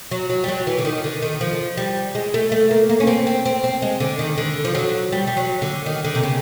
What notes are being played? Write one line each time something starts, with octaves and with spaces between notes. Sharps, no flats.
F#3
F#3
G3
F#3
E3
D3
D#3
D3
D#3
F3
G3
G#3
A3
A3
A#3
A#3
C#4
C4
C4
C4
C4
G#3
D3
D#3
D3
F3
F#3
G3
G3
F#3
D3
D#3
D3
C3
C#3